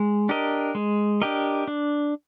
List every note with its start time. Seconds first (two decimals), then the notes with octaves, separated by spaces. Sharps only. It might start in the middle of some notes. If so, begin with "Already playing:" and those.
Already playing: G#3
0.29 D4 G4 A#4 D#5
0.75 G#3
1.22 D4 G4 A#4 D#5
1.68 D4